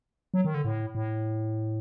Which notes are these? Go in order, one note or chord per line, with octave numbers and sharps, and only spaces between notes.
F#3
D#3
D3
A2
A2